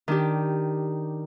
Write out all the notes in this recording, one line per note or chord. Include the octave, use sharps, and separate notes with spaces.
D#3 D4 G4